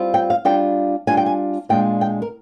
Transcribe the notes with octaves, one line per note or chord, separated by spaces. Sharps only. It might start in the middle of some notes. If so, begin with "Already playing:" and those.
Already playing: G3 C4 F4
G5
F5
G3 D4 F4 G5
G3 D4 F4 G#5
G5
G#5
A#2 G#3 D4 F4 G5
G5
A#4